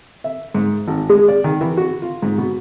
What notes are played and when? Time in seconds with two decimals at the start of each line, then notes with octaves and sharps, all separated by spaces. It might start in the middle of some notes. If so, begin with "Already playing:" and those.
0.24 E5
0.54 G#2
0.88 G#1
1.10 G#3
1.28 D5
1.44 D#3
1.61 E3
1.77 F#4
2.02 F4
2.22 G#2
2.38 B2